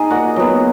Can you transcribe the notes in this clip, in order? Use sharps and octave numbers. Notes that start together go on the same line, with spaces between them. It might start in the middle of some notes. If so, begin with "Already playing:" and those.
Already playing: D#4 G#4 D#5 G#5
A#2 F#4 F#5
F#3 B3